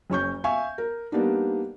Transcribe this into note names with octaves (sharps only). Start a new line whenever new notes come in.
F#1 C#4 C#6 G6
E5 F5 G#5 C#6
A#4
G3 A#3 B3 D4 D#4